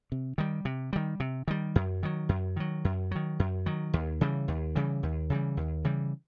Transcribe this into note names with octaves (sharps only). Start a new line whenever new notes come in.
C3
D#3 G3
C3
D#3 G3
C3
D#3 G3
F#2
D#3 F#3
F#2
D#3 F#3
F#2
D#3 F#3
F#2
D#3 F#3
D#2
C#3 E3 G3
D#2
C#3 E3 G3
D#2
C#3 E3 G3
D#2
C#3 E3 G3